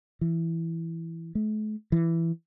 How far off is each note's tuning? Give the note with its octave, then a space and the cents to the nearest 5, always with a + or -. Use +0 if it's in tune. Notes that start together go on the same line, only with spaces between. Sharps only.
E3 +5
A3 -45
E3 +10